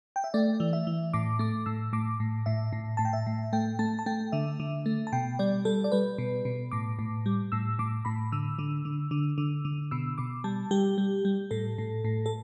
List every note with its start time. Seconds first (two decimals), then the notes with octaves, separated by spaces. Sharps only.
0.16 G5
0.24 E5
0.34 A3 D5
0.60 E3
0.73 E5
0.87 E3
1.13 A2 D6
1.39 A3 D6
1.66 A2 E6
1.93 A2 D6
2.20 A2
2.46 A2 E5
2.73 A2
2.97 A2 A5
3.05 G5
3.13 E5
3.27 A2
3.53 A3 G5
3.79 A3 A5
3.99 A5
4.06 A3 G5
4.32 D3 E5
4.60 D3
4.86 A3
5.07 A5
5.13 B2 G5
5.39 G3 D5
5.65 G3 A4
5.84 D5
5.92 G3 B4
6.18 B2
6.45 B2
6.72 A2 D6
6.99 A2
7.26 G3
7.52 A2 E6
7.79 A2 D6
8.05 A2 B5
8.32 D3 E6
8.59 D3
8.85 D3
9.11 D3
9.38 D3
9.65 D3
9.91 B2 E6
10.18 B2 D6
10.44 G3 A5
10.71 G3 G4
10.98 G3
11.25 G3
11.51 A2 A4
11.78 A2
12.04 A2
12.26 A4